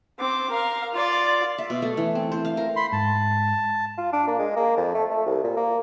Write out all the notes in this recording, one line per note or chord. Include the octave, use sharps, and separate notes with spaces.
C4 D6
A#4 F5
F4 D5
E5
B2
A3
E3
C4
C5
F5
A#4
B5 C6
G#2 A5
F4
D4
A#3
G#3
A#3
F2
A3
A3
C2
A#2
A#3